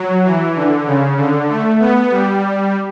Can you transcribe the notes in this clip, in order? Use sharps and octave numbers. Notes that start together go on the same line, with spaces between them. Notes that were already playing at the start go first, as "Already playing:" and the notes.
Already playing: F#3
E3
D3
C#3
D3
A3
B3
G3